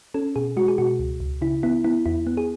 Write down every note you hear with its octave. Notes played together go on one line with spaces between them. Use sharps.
C#4 A4
B2 G#4
G#3 F#4
G#4
B2 F#4
C#2
C#2
C#3 E4
B3 E4
B3 E4
E2 E4
B3
G#4